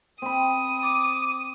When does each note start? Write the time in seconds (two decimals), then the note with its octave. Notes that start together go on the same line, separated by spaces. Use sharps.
0.22 C4 B5 D#6
0.83 D6